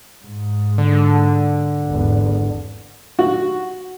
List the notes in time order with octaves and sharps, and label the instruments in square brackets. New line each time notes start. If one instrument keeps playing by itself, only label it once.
[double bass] G#2
[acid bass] D3
[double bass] G#1 E2
[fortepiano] F#4